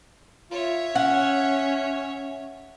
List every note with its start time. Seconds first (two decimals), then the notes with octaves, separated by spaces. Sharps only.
0.51 F4 C#5 E5
0.95 C#4 F#5